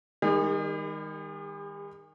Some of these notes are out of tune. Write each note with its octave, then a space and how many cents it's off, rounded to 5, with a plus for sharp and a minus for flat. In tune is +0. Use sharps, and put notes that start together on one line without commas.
D#3 +0 G3 +40 G#4 -35